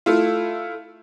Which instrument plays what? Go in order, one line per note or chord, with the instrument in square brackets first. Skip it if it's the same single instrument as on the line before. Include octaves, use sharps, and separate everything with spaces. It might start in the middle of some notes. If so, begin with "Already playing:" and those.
[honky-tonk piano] A3 E4 F4